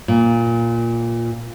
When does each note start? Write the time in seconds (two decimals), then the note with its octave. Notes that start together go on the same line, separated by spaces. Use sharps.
0.08 A#2